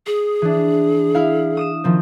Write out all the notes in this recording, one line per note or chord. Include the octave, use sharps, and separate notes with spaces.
G#4 D#6
E3 D4
E4 F5
D#6 D#7 E7
D#3 F3 C4